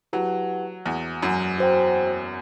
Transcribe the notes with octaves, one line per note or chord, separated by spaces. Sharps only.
F#3 E4 G4 B4 F#5 A5
E2
F#2
F#4 C5 G5